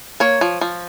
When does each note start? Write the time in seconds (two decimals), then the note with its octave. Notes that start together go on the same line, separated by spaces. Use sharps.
0.20 A#3 C#5
0.41 F3
0.61 F3